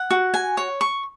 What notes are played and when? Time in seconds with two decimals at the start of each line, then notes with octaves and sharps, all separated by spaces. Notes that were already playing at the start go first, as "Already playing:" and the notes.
Already playing: F#5
0.11 F#4
0.34 G#5
0.57 C#5
0.81 C#6